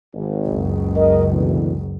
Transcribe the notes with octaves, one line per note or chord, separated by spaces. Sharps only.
G#1
F#1 C#2
A#4 D#5
D2 B2 E3